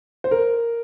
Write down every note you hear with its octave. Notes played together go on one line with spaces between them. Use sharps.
C5
A#4